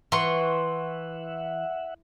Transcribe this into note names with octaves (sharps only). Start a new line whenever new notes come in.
E3 E5 F#5 C6 C#6